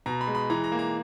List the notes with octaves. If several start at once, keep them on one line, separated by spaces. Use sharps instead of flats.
B2 A#5
B5
G#3
B5
E3 A#5
A#5
A#3
A#5